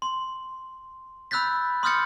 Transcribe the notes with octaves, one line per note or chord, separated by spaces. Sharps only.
C6
B5 E6 F#6 G6 A6 B6
C6 D#6 F6 G6 A6 C#7